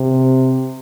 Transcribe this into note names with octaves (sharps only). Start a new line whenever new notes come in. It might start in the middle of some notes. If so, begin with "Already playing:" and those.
Already playing: C3